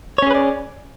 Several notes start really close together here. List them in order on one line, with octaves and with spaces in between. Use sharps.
C#5 C#4 G#4 B4 D5